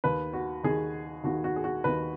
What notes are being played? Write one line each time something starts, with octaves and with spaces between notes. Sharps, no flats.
D#2 D#3 B4
F#4
D#2 D#3 G#4
D#2 D#3 F#4
F#4
G#4
F#4
D#2 D#3 B4